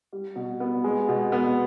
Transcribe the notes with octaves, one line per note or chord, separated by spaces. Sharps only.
G3
B2
B3
G#3
B2
B3